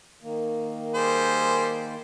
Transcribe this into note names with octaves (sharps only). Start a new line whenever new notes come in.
D#3 A#3
G3 G#4 C5